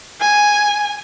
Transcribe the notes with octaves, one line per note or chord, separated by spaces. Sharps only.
G#5